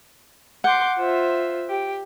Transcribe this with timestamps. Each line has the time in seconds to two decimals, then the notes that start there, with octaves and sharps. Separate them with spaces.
0.64 F#5 C6 D6 G6
0.97 F4 C5 E5
1.68 G4